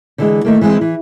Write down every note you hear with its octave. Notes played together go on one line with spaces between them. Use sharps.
D3 E3 G#3
D#3 A3 A#3
E3 G#3 C4
E3